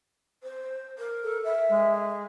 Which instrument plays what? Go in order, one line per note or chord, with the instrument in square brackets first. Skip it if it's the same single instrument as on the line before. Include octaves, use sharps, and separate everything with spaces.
[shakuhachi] C5
A#4
[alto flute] A4
[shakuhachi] E5
[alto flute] G#3